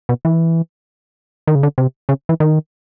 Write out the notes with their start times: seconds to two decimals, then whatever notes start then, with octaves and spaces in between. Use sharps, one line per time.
0.09 B2
0.25 E3
1.48 D#3
1.55 C#3
1.63 D3
1.78 C3
2.09 C#3
2.29 E3
2.40 D#3